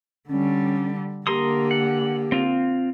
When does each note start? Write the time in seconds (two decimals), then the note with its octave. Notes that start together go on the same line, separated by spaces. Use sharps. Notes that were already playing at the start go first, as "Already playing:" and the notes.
0.29 D3 G3 C#4
1.27 D3 A#3 G4 A#4 C6 D#6
1.71 F#5
2.32 C4 F4